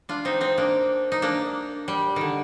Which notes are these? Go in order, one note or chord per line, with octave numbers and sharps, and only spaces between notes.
D4 F4
C4 D#4
C4 D#4
A#3 D4
D#4
A#3 D4
G3
D3 D#3